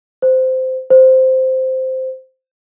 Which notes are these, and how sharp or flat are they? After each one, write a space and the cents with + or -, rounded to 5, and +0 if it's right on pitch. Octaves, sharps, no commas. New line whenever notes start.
C5 -15
C5 -5